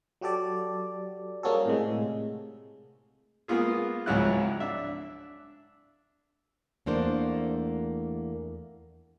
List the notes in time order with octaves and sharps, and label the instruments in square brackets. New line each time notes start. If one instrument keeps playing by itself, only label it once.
[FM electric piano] F#3 F#4 G4 A4 D5
G3 A#3 C#4 F#4 G#4 A4
A2 C3 G#3
[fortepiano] G#3 A#3 B3 F4 G#4
C#2 G#2 F3 F#3 E4 F#6
D4 E5
[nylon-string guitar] E2 A3 A#3 D4 C5